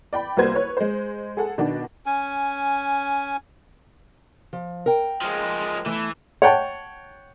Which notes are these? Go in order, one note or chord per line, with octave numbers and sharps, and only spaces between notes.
D5 G5 B5
C2 A#3 F#4 B4 C5 G#6
B4 C#5
G#3 C5
G#4 A4 F#5
B2 D#3 D4 F#4
C#4 G#5
F3
A#4 G5
F3 G#3
E3 A3
C#5 F#5 G5 A5